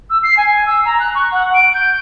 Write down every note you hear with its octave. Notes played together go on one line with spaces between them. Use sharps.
E6
C7
G#5
E6
A#5
F#6
C#6
F#5
D7
G6